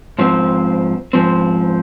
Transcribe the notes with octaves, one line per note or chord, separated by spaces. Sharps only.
G#2 F3 C4
G#2 F3 C4